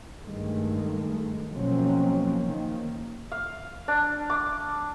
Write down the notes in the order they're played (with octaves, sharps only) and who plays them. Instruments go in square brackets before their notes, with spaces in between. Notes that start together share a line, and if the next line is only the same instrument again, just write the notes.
[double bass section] G2 D#3 G#3 A3
B2 F3 F#3 A#3 C4 C#4
D#3 A#3
[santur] F5
D4
D6